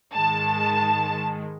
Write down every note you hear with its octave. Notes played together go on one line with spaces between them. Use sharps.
G#2 D#3 G#3 A5